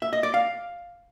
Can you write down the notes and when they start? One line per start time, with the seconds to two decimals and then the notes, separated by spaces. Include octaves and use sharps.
0.02 E5
0.13 D#5
0.23 D5
0.34 F5